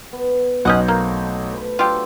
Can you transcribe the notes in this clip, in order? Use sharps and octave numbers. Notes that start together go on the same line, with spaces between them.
B3
B1 C#4 D#5 F#5 G6
A3 A#3 C5
B4 B5
D3 F#3 F4 G4 A4